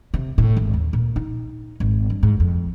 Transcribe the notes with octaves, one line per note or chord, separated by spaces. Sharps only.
C3
A2
G#1
D#2
A#2
D#4
G#1
G2
G#2
F2